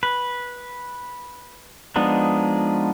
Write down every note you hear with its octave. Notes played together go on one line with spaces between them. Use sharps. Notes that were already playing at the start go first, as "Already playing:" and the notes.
B4
F3 G#3 B3 D4 D#4